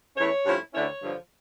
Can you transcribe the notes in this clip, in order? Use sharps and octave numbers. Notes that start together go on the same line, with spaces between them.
E2 E3 A3 C#4 C#5
G2 F3 A3 C#4 E4
D2 D3 A3 C#4 E4 C#5
G2 D3 F3